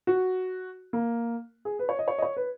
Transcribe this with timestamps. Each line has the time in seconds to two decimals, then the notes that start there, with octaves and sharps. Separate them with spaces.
0.07 F#4
0.93 A#3
1.65 G#4
1.79 B4
1.89 C#5
1.99 D#5
2.08 C#5
2.18 D#5
2.22 C#5
2.37 B4